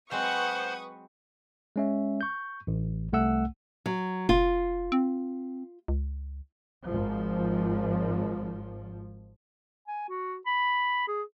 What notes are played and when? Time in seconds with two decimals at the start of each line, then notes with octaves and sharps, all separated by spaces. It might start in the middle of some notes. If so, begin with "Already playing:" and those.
0.11 F#3 G#3 C4 B4 C5 F#5 C#6 D#6
1.76 G#3 C#4 E5
2.21 C#6 G6
2.67 A1
3.13 C2 A3 F#5 E6
3.86 F#3
4.29 F1 F4
4.92 C4
5.88 C#2
6.86 G#1 F3
9.88 G#5
10.09 F#4
10.47 B5
11.08 G#4